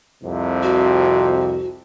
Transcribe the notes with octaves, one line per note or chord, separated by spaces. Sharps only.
C2 F2 C3
F#4